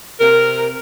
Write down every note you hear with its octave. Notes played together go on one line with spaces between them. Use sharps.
C3 A#4